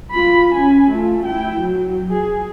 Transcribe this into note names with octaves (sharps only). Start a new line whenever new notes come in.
F4 B5
C#4 G#5
A3 F4
E4 G5
F#3
G#4